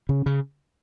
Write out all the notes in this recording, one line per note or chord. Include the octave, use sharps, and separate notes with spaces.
C#3
C#3